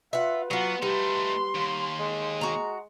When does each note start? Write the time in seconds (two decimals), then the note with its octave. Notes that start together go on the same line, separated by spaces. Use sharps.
0.13 F4 B4 E5 F#5
0.51 F#3 B3 F4 F#4
0.82 G3 A3 D#4 C6
1.55 D#2
2.00 G#3
2.41 F#4 A#5